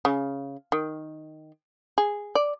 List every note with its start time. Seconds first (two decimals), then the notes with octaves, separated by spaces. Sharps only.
0.05 C#3
0.72 D#3
1.98 G#4
2.35 D5